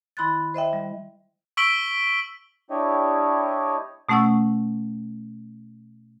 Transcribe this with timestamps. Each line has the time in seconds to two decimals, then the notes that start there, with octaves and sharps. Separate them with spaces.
0.17 D#3 E4 B5 C6 F#6 A6
0.54 C5 D#5 E5 G5
0.73 G3
1.57 C#6 E6 B6 D7 F#7 G7
2.70 D4 E4 G4 C#5 D#5
4.09 B2 A3 C#4 F#5 C#6 E6